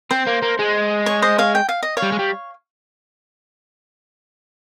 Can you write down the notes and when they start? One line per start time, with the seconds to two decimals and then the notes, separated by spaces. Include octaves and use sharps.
0.11 C4 C5
0.27 A#3
0.42 A#3
0.59 G#3
1.06 C#5
1.22 C5 D#5
1.38 C#5 F5
1.55 G5
1.69 F5
1.83 D#5
1.97 C#5 F5
2.02 G3
2.12 G#3
2.19 G3